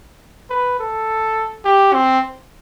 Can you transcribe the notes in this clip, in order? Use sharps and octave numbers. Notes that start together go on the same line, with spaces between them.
B4
A4
G4
C4